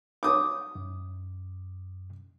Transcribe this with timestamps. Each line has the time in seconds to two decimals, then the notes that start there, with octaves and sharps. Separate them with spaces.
0.23 D6 D#6
0.75 F#2